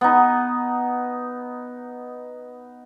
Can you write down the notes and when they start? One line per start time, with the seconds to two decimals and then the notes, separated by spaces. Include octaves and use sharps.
0.01 B3 D#4